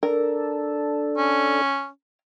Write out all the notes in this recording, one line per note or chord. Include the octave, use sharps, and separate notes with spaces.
D4 A4 A#4
C#4